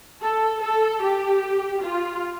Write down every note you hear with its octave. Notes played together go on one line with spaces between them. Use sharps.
A4
A4
G4
F4